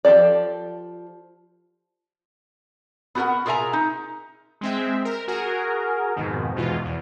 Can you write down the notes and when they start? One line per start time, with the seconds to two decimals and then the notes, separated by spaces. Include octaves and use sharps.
0.05 F3 G4 A4 D5
3.15 B3 F#4 G4 A#4 F#5
3.46 F4 G#4 A#4 E5 G#5 A#5
3.73 D#4
4.61 G#3 C4 E5
5.05 A#4
5.28 F#4 G#4 A#4
6.16 F2 G#2 B2 D#3
6.56 E2 G#2 B2 F4
6.85 E2